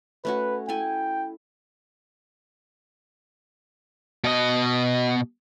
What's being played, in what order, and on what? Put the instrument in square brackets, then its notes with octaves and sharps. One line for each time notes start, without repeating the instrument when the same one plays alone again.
[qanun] A3 C#4 F#4 [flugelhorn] B4
[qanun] E4 A4 G#5 [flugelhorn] G5
[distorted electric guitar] B2 D#5